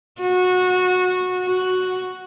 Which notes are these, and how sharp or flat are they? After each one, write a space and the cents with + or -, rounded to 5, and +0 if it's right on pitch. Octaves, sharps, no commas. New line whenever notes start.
F#4 -20
F#4 -5